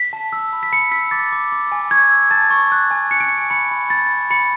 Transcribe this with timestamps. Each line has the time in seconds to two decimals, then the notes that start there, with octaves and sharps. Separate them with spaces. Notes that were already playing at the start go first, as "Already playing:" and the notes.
Already playing: B6
0.13 A5
0.33 E6
0.53 B5
0.63 B6
0.72 B5 C#7
0.91 E6 B6
1.11 D6 A6
1.32 D6
1.52 D6
1.72 G#5
1.91 C#6 G#6
2.11 E6
2.31 A5 A6
2.51 C#6
2.72 F#6
2.91 G#5
3.11 F#6 C#7
3.20 D7
3.28 G#5 C#7
3.50 B5 C#7
3.71 B5
3.90 B5 A6
4.10 B5
4.30 B5 C#7